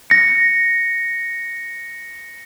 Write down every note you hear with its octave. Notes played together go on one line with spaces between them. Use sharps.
A#6 C#7